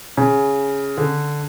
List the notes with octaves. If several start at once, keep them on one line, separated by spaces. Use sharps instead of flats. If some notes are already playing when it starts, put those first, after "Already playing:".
C#3
D3